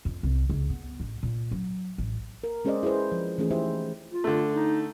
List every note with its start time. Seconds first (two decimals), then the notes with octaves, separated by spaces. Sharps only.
0.05 F2
0.23 C2
0.50 C#2
0.70 B3
1.00 A1
1.23 A#2
1.51 F#3
1.98 A1
2.44 A#4
2.65 G#3 C#4 G#4 C5 D5 D#5
2.83 E4 G#4 B4 C5
3.12 F3
3.38 E3 A3 C#4 G#4
3.50 D#4 E4 G4 C5 E5
4.11 F4
4.24 D3 A3
4.55 D#4